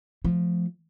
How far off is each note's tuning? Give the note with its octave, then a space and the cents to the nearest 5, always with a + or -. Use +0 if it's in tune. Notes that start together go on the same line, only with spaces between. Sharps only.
F3 +0 A3 -25